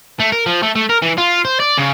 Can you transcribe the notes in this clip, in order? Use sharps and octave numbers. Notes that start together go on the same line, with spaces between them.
A3
A#4
F3
A3
A3
A#4
E3
F4
C5
D5
C#3